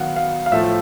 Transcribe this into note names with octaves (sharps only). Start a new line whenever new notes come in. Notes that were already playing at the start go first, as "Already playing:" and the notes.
Already playing: D#3 F#3 B3 F5 F#5
F5
F5
A2 F3 A3 E5